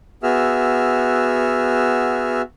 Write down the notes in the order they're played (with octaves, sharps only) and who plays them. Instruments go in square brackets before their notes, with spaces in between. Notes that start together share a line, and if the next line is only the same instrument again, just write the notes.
[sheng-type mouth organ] B3 F#4 G#4 E5 E6 F6